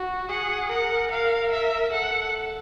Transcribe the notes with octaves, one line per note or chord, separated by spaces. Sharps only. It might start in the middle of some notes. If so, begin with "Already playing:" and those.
Already playing: F#4
G#4 F#5
A#4 F#5
A#4 F5
E5
A4 F#5